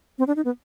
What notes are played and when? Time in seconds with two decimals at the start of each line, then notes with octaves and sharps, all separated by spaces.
0.19 C4
0.27 D4
0.36 D#4
0.45 B3